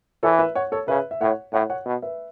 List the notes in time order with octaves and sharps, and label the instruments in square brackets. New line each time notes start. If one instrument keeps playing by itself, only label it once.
[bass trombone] E3 [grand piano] A4 C#5
[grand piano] B4 E5
C#5 F#5
A4 C#5
[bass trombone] C#3 [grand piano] B4 E5
[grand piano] E5
[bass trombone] A2 [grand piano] C#5 F#5
[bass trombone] A2 [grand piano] C#5 F#5
[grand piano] C#5 F#5
[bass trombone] B2
[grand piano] B4 E5